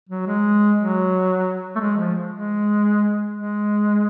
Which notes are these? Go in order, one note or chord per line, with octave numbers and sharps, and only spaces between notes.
F#3
G#3
F#3
A3
G#3
F3
G#3
G#3